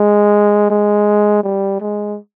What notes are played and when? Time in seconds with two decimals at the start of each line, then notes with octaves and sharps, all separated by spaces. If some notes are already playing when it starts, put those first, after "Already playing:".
Already playing: G#3
0.70 G#3
1.43 G3
1.80 G#3